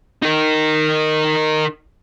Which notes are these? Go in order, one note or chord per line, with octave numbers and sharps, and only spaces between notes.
D#4 A#4